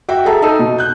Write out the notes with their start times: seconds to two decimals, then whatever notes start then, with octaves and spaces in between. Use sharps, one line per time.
0.08 F#4 E5 F#5 G5
0.25 G#4 A4 E5 A5 A#5
0.42 D#4 A4 A5 E6 D#7
0.59 B2
0.78 F#6 G6